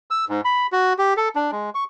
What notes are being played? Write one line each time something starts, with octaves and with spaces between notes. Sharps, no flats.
E6
G#2
B5
F#4
G4
A4
D4
G#3
C#6